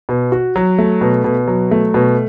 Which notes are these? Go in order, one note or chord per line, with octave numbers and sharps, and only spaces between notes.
B2
F#4
F#3
A3
B2
B2
F#3
A3
B2